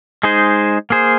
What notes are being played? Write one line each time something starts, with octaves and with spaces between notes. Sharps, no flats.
G#3 D#4 G#4 C5
A#3 G#4 C5